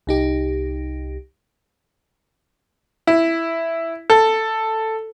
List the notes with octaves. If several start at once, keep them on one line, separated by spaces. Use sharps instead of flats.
C2 D#4 G4
E4
A4